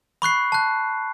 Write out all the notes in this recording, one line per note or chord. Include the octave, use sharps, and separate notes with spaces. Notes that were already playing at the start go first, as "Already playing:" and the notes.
B5 C#6 F#6 C7
A5 F#6